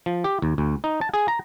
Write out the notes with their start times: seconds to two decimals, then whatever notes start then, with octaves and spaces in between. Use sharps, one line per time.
0.06 F3
0.24 G4
0.42 D#2
0.58 D2
0.84 D#4
1.01 A5
1.14 G#4
1.28 A#5